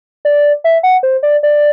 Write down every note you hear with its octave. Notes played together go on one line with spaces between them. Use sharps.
D5
E5
F#5
C5
D5
D5